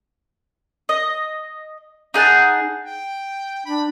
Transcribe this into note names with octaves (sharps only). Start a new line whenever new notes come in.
D#5
D#4 G#4 F#5 A5
G5
D4 B5